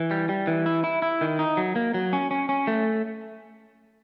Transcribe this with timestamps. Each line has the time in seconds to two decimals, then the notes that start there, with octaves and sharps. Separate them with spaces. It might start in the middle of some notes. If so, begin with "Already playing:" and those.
Already playing: E3
0.11 G3
0.29 G3
0.47 E3
0.66 E4
0.84 E4
1.02 E4
1.21 D#3
1.39 D#4
1.57 F#3
1.76 A#3
1.94 F#3
2.13 C#4
2.31 C#4
2.49 C#4
2.67 A3